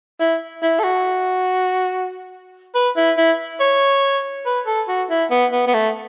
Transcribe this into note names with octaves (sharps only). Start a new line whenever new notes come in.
E4
E4
A4
F#4
B4
E4
E4
C#5
B4
A4
F#4
E4
B3
B3
B3
A3